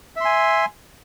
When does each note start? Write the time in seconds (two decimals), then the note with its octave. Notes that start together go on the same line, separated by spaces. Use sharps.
0.16 E5
0.21 C6
0.25 G#5